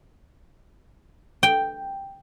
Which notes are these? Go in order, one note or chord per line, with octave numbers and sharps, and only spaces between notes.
G5